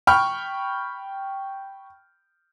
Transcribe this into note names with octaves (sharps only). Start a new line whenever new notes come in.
G5 B5 C#6 F6